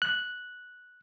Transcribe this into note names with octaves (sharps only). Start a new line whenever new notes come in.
F#6